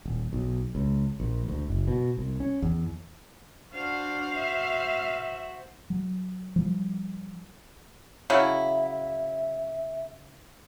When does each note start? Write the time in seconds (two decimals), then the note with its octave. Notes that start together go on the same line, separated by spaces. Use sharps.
0.05 D#1
0.33 B1
0.75 C#2
1.20 A#1
1.48 D2
1.68 F#1
1.88 B2
2.17 C2
2.40 C#4
2.62 E2
3.74 D4 F#4 C5 F5
4.36 E5
5.90 F#3
6.56 F3 G3
8.30 C#3 F#3 E4 E5